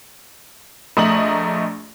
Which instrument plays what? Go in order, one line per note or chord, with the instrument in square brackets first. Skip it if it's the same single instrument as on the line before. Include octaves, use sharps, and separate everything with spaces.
[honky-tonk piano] A#1 A3 D#5 A#5 F#7